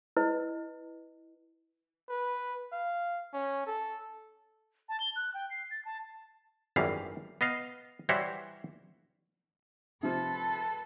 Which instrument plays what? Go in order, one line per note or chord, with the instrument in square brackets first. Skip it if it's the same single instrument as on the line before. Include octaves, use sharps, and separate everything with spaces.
[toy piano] E4 B4 D#5
[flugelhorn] B4
F5
C#4
A4
[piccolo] A5
G7
F#6
G5
C7
A6
A5
[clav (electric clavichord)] G#1 F#2 E3 G3 F5
B3 D#5 F5
E3 G3 E4 F#4 C5 C#5
[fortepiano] C3 F3 [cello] A4 B4